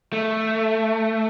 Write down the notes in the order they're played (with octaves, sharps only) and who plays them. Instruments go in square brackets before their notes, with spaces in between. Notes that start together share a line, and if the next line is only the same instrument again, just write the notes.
[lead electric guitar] A3